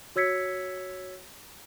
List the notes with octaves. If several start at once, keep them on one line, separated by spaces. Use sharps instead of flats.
F#4 C#5 E6 G#6 B6 C#7